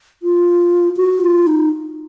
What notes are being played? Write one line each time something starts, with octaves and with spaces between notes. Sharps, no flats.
F4
F#4
F4
D#4